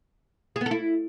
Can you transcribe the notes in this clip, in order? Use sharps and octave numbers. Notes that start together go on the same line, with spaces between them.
G#4
B3
A4
E4